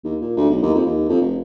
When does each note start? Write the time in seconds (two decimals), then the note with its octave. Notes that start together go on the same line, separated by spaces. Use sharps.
0.04 D#2
0.21 A#2
0.37 D2
0.50 B1
0.62 D#2
0.74 F2
0.86 D#2
1.09 F2
1.21 F1